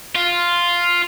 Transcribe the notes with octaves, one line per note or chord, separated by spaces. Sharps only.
F4